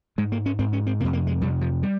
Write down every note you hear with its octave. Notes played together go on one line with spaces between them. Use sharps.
G#2 G#3
A#3
C#4
G#2 C4
C#4
C4
F2 C3 A#3
A#3
G#3
F2 C3 G3
F3
G3